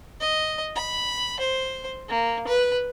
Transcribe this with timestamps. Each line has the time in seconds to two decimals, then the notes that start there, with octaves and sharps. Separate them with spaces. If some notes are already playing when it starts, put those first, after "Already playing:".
0.20 D#5
0.75 B5
1.40 C5
2.09 A#3
2.47 B4